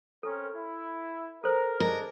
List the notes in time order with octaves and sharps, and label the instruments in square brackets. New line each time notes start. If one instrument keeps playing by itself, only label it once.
[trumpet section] C4 C#4 A#4 [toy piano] A4
[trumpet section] E4
[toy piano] A4 C5 [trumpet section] A#4
[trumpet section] D4 G#4 D#5 [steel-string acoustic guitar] A#4